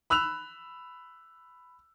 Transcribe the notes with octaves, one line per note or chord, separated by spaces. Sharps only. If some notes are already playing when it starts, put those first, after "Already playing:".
B5 E6 F#6 F7